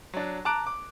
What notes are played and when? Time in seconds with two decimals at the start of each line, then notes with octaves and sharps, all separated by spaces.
0.14 F#3 D4
0.45 A5 A#5 D6 F#6 D7
0.67 D6